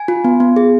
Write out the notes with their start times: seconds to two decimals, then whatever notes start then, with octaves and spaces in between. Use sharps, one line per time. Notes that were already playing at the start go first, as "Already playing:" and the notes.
Already playing: G#5
0.08 F4
0.24 B3
0.40 B3
0.56 G#4